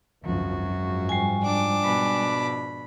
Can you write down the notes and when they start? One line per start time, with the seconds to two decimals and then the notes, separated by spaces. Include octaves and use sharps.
0.23 G#1 C#2 F#2 F3 F#4
0.69 G#2 F3
1.09 G3 G#5
1.43 D4 D6
1.84 B2 B5